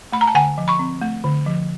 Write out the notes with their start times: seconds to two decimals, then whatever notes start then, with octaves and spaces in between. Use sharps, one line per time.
0.12 A3 B5
0.21 A#5
0.28 A5
0.35 D3 F#5 G#5
0.58 F3
0.68 B5 C#6
0.79 C4
1.01 A3
1.24 D3
1.46 F3